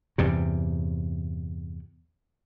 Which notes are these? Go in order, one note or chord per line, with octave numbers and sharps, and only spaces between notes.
E2 G2 C3